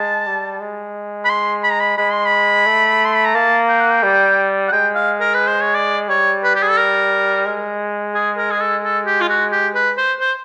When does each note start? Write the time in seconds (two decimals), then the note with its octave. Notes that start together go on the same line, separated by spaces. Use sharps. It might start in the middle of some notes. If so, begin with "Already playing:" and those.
Already playing: G#3 A5
0.27 G3
0.60 G#3
1.25 B5
1.29 C6
1.64 B5
1.72 A#5
1.80 B5
1.98 G#3 B5
2.12 C6
2.26 B5
2.66 A3
3.05 C6
3.15 B5
3.25 A#5
3.35 A#3 A5
3.69 G5
3.81 F#5
3.92 G5
4.03 G3
4.68 F#5
4.72 G#3 G5
4.95 F5
5.20 A#4
5.34 B4
5.47 C5
5.61 C#5
5.75 D5
6.09 G3 C#5
6.44 B4
6.55 G4
6.63 G#4
6.70 A4
6.77 A#4
7.46 G#3
8.15 G#4
8.37 A#4
8.51 G#4
8.61 A4
8.84 A4
9.06 G4
9.21 F4
9.29 F#4
9.52 G4
9.75 B4
9.97 C5
10.20 C5